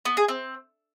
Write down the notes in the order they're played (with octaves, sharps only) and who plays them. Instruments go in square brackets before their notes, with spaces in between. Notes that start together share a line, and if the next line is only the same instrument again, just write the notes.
[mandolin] B3
G#4
C4